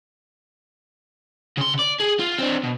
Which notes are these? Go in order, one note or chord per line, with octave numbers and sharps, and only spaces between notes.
C#3 C6
D5
G#4
F4
C4 D4
B2